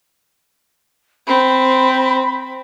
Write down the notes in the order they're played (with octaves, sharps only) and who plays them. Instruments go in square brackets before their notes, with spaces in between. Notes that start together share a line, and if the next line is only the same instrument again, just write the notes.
[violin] C4 [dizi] B5